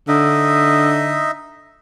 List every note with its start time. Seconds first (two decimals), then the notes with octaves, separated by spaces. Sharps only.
0.08 D3 D#4 D#5 E5